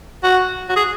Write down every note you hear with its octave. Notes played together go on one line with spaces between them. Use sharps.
F#4
F#4
G#4